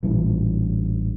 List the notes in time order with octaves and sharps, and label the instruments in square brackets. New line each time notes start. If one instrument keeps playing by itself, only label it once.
[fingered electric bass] A1 G2 A#2 E3